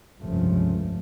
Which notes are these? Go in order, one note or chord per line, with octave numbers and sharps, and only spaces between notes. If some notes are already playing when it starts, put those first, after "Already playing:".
F1 C#2 G2 F3 A3 C#4